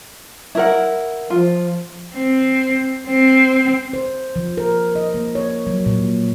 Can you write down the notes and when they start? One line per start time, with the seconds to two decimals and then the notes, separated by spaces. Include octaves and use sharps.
0.55 E4 A#4 F#5
1.30 F3 F4
2.15 C4
3.08 C4
3.93 C5
4.36 F3
4.57 A#4
4.95 D#5
5.14 A#3
5.35 C#5
5.67 F#3
5.86 A#2